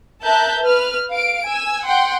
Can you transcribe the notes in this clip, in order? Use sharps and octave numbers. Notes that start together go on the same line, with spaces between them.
A#4 E5 A5 A#5 F#6 G6
B4 F6
F5 D7
G#5 E6
F#5 G5 C6